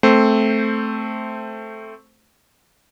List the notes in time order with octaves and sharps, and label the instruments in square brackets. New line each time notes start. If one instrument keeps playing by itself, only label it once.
[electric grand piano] A3 C4 C5